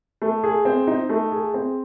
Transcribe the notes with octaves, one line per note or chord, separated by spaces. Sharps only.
A3
G#4
C4
D#4
A3
G#4
C4